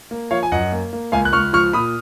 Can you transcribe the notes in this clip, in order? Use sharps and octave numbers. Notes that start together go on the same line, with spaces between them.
A#3
F3 C#5 F5
G#5
F#2 D#5 F#5
A#3
A#3
C#2 F5 G#5
F#6
C#2 C#6 F6
F3 C#6 F6
A#2 B5 D#6